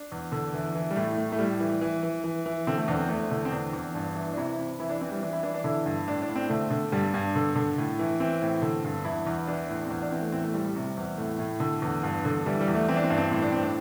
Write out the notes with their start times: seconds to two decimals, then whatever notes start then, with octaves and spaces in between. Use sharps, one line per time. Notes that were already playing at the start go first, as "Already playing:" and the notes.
Already playing: D4
0.12 E2
0.32 D3
0.54 E3
0.75 E3
0.91 G3
0.96 A2 A3
1.17 A2
1.32 A3
1.39 A2 G3
1.60 E3
1.81 E3
2.03 E3
2.24 E3
2.46 E3
2.67 D3 C4
2.78 A3
2.88 E2 D4
2.98 C4
3.09 E2 A3
3.31 D3
3.45 C4
3.51 E2 D4
3.73 E2
3.95 G2
4.16 E3
4.32 D4
4.37 C3 E4
4.59 C3
4.79 E3 E4
4.90 D4
5.01 E3 C4
5.12 G3
5.22 E3 D4
5.33 E4
5.43 E3 D4
5.54 D4
5.64 D3 E4
5.86 G2
6.07 A2 D4
6.22 D4
6.28 A2
6.36 C4
6.49 D3 A3
6.71 D3
6.92 G2 G3
7.14 G2
7.36 D3
7.56 D3
7.78 A2
7.99 E3
8.20 E3 C4
8.42 A2
8.62 D3
8.84 G2
9.05 E2 E4
9.27 E2
9.47 E3 D4
9.69 A2
9.85 C4
9.91 E2 D4
10.02 D4
10.11 E3 C4
10.22 A3
10.32 A2 C4
10.44 A3
10.54 A2 G3
10.65 G3
10.76 C3
10.97 E2
11.17 A2 A3
11.39 A2
11.60 D3
11.82 E2
12.03 G2
12.25 D3
12.46 E3 G3
12.61 G3
12.68 E2
12.75 A3
12.88 E3 C4
12.96 D4
13.04 C4
13.10 G2 D4
13.18 C4
13.31 A2 C4
13.42 D4
13.52 A2 C4
13.63 D4